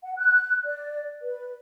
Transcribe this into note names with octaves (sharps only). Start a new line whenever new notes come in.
F#5
F#6
D5
B4